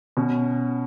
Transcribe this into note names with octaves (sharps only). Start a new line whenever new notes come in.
B2 C#4